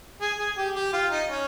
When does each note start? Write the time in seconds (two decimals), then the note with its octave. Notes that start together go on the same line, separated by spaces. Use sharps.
0.21 G#4
0.39 G#4
0.57 G4
0.75 G4
0.93 F4
1.11 D#4
1.29 C#4